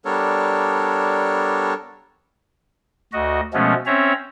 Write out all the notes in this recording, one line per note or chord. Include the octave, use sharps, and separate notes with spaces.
G3 B3 D4 A4 A#4 C#5
D2 F#4 D#5
B2 F3 G#3 A3 B3 C#4
C4 C#4 C#5 E5 A#5